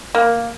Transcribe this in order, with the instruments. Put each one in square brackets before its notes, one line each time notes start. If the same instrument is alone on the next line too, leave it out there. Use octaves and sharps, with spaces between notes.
[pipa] A#3